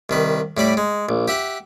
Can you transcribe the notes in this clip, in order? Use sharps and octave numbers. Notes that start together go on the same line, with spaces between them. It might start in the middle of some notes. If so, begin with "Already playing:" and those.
C2 D#3 B4
A2 G3 D5 B5
G#3
A#1
G4 E5 F#5